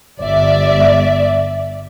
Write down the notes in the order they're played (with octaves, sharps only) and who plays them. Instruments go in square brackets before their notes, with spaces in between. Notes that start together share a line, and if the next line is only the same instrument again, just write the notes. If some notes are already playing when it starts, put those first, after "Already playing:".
[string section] G1 D5 E5